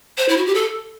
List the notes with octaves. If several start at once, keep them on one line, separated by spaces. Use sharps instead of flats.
C5
E4
F#4
G4
A4